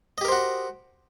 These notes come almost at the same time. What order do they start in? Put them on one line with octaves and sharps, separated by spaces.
D#5 G4 A#4 C5 F#4